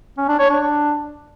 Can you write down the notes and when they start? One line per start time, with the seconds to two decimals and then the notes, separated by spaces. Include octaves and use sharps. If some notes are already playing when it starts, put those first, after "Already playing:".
0.18 C#4
0.29 D4
0.39 C#5
0.50 D4